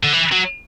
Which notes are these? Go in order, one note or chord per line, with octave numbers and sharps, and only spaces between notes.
D3
E3
F#3